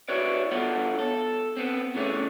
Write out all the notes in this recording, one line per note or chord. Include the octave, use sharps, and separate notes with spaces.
E4 F#4 B4 C#5 D5
G2 B3 F4 A4 C#5 F#5
A4
B3 C4
C#3 E3 A3 C#4